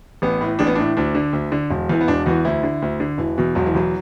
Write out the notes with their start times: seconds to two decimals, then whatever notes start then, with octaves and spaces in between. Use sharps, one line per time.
0.22 A1 B3
0.41 A2 E3
0.59 A1 D4
0.67 B3
0.75 A2 E3 D4
0.97 D2 D4
1.15 D3
1.33 D2
1.52 D3
1.70 E1
1.90 E2 E3
2.01 B3
2.08 E1 D4
2.26 E2 E3 F#4
2.45 D2 E4
2.63 D3
2.82 D2
3.00 D3
3.18 E1 E3
3.38 E2 B2
3.55 E1 F#3
3.66 E3
3.75 E2 B2 F#3